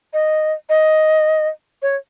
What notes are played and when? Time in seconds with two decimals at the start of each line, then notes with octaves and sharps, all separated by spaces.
0.13 D#5
0.69 D#5
1.82 C#5